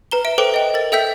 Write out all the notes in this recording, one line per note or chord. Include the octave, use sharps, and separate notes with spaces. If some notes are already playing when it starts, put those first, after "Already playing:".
B4 A#5 G7
E5 D7
A4 B4 C5 G5 D6 D7
D#5 G5
A#4 A6
A4 E5 G5 E6 G6 B6